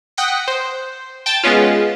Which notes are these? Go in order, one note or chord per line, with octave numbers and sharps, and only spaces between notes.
F#5 G5 D#6 A#6 B6 C#7
C5
G5 A5 A6
G#3 B3 C#4 F4